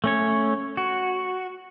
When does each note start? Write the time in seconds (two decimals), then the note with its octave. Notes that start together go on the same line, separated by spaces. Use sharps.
0.04 A3 C#4 C#5
0.77 F#4